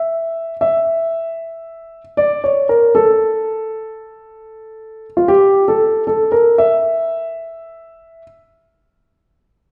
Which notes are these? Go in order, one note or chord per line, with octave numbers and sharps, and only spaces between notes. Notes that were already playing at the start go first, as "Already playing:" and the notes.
Already playing: E5
E5
D5
C#5
A#4
A4
F4
G4
A4
A4
A#4
E5